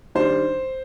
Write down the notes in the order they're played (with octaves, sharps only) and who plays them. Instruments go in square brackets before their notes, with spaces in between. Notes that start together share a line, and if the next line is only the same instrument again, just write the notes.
[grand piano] D#3 G3 D4 C5